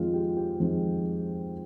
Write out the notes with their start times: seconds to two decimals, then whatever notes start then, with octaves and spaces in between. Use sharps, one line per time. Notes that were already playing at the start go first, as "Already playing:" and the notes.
Already playing: F2 D#3 G#3 C4 F4
0.14 G4
0.37 G4
0.60 F2 D#3 G#3 C4